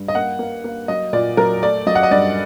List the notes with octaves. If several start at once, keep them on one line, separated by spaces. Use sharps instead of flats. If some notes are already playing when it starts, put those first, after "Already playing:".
Already playing: G2
D#5
A#3 F#5
A#3
A#3
F#3 D#5
A#2 D5
F#3 A#4
A3 D5
F#3 D#5
F#5
D#5
G2 D5